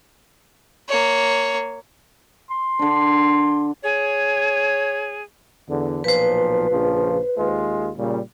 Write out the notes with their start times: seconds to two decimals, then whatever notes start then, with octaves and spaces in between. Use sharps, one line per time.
0.88 A#3 C#5
2.50 C6
2.79 D3 D4
3.84 G#4 C#5
5.70 E2 D3
6.04 B1 A#2 F3 B4 C5
6.70 A#1 C#3 F3
7.38 D#2 G#3 F4
7.98 A#2 C#3 G3